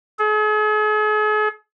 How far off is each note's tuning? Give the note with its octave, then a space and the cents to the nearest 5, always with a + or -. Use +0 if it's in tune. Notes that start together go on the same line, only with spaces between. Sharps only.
G#4 +45